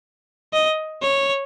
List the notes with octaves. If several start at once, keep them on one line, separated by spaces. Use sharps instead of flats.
D#5
C#5